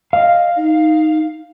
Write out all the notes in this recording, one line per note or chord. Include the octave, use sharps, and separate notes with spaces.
D#5 F5
D#4